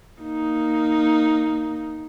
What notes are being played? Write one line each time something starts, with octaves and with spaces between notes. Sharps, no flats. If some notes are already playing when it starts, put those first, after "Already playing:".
A#3 D#4